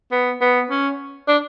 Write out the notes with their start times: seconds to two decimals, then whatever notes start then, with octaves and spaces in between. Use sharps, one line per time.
0.12 B3
0.41 B3
0.70 C#4
1.28 D4